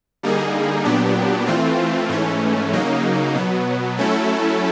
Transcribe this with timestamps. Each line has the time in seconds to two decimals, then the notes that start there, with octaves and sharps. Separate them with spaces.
0.23 D3 G3 A#3 D#4 G#4
0.85 A#2 F#3 B3 D4 G4
1.47 E3 A3 C4 F4
2.09 G#2 E3 A3 C#4
2.73 C#3 F#3 A#3 D#4
3.35 B2 F#3 B3
3.97 F#3 A3 C#4 E4 A4